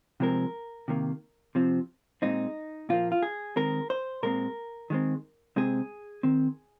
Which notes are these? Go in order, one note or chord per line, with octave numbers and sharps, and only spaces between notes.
C3 F3 G#3 C4 A#4
C3 D#3 A#3
C3 F3 C4
A#2 G#3 C4 D#4
A#2 F3 A#3 F4
F4
G#4
D#3 G#3 C4 A#4
C5
A#2 G#3 C4 A#4
D#3 G#3 C4
C3 G#3 C4 G#4
D#3 C4